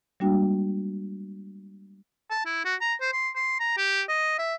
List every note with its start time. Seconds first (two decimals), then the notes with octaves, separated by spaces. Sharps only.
0.20 G3 G#3 A#3 D4 F#4 G5
2.30 A5
2.45 E4
2.65 F#4
2.81 A#5
3.01 C5
3.13 C6
3.36 C6
3.60 A#5
3.77 G4
4.08 D#5
4.39 E5